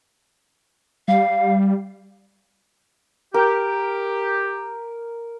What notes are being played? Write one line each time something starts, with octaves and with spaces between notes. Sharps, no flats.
G3 F5
G4 A#4